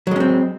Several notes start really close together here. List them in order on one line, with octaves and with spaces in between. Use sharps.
F#3 G#3 C#4 C4